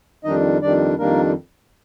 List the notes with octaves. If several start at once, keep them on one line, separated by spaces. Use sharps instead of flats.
F2 D#3 G3 D4 D#4 D#5
F2 D#3 G3 D4 D5
F2 D#3 G3 A#3 D4 A#4